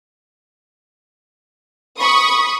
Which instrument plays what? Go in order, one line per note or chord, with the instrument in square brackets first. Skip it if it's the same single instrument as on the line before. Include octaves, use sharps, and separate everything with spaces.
[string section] B5 C#6 D#6